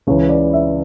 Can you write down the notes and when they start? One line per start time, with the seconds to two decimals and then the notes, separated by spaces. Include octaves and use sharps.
0.07 C#2 C#3 E3 C#5
0.29 D5
0.53 E5